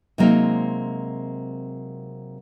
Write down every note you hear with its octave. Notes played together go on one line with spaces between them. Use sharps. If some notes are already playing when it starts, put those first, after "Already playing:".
C3 F#3 G#3 A#3 C4 D#4